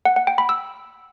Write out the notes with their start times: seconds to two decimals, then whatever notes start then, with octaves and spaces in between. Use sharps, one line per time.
0.05 F#5
0.16 F#5
0.27 G5
0.38 B5
0.49 E6